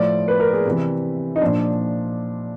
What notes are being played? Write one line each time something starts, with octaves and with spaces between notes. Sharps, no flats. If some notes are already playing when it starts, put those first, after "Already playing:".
Already playing: A2 F3 D5
B4
A#4
G#4
C3 E3
D#4
A#2 F3 D4